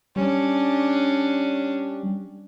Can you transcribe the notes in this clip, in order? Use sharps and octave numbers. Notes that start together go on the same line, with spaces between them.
G3 C#4 D4